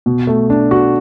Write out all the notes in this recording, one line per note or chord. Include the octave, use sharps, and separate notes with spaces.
B2
A3
D4
F#4